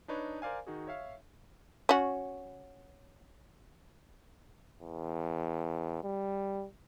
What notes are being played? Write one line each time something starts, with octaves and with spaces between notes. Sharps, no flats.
D4 D#4 B4 C#5
A#4 C5 D5 F5 G#5
D#3 D#4 F#4 G#4
C#5 E5 F5
C#4 F#4
E2
G3